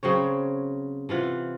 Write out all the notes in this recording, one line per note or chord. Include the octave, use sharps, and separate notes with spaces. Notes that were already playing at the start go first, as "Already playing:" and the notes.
C#3 F#3 C4 C#5
C3 E3 F4 F#5